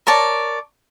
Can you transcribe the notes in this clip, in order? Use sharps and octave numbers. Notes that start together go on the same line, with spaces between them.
A#4 C#5 D5 A5